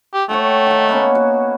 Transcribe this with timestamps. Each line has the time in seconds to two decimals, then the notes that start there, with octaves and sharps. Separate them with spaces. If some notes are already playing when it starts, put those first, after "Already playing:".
0.14 G4
0.29 A3 C#5 F#5 G5
0.67 D#3 F#5
0.89 A#3 B3 C#4
1.15 F#4